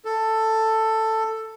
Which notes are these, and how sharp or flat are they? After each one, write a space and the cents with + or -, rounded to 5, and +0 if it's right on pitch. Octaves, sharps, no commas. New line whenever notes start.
A4 +10